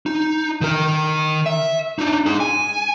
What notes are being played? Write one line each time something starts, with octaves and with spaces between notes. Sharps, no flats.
D#4
D#3 A#4
E5
D4 D#4
D#4 G#4
G#5